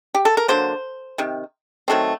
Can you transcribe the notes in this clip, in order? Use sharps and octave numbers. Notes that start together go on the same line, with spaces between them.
G4
A4
A#4
D3 F#3 A#3 C5
C3 D#3
D#3 F#3 A3 C4